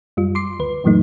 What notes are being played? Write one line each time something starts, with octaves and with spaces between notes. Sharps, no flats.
F#2 G3 F4
C6 D6 C7
D2 B4
F#2 A#2 E3 F#3 A3 D#4